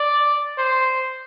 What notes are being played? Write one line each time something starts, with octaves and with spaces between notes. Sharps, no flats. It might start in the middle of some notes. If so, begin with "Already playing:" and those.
Already playing: D5
C5